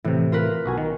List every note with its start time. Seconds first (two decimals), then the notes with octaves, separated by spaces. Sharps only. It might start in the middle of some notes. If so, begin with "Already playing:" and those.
0.05 A2 C3 E3
0.32 F4 A#4 B4
0.66 B1 F#4 G#5
0.78 D#3